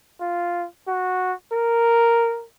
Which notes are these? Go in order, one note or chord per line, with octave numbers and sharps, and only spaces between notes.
F4
F#4
A#4